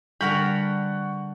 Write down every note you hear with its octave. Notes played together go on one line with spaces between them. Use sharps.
D3 G3 A#4 F#5 B5 C#6 G6